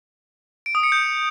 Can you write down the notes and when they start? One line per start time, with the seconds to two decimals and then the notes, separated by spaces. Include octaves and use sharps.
0.66 D7
0.75 D#6
0.83 C#7
0.92 G6